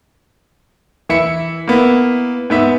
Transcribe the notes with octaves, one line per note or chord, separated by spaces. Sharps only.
E3 E4 E5 C#7
A#3 B3 E4
G#2 B3 E5